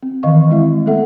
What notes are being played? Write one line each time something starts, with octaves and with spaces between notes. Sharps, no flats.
C4
D#3 E3 D#5 F5 C#6
G#3 C4 E4 E5
G#3 A3 B3 A4 E5 F#5